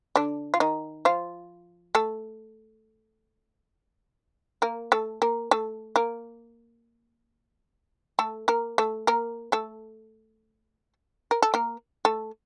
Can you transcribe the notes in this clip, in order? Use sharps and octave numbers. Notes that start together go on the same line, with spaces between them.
D3 D4
F4
D#3 D#4
F3 F4
A3 A4
A#3 A#4
A3 A4
A#3 A#4
A3 A4
A#3 A#4
A3 A4
A#3 A#4
A3 A4
A#3 A#4
A3 A4
A#4
A4
A#3 A#4
A3 A4